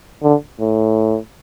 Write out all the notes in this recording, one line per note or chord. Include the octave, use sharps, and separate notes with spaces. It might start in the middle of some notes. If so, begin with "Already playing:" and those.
D3
A2